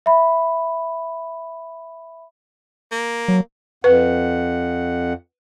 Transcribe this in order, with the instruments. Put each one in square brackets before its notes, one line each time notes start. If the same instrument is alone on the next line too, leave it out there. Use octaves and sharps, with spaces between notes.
[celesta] E5 B5
[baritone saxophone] A#3
[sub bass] F#3
[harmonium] F2 F#5 [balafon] B4